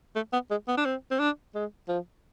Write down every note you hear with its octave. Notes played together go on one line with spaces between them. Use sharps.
A3
B3
G#3
B3
D4
C4
C4
D4
G#3
F3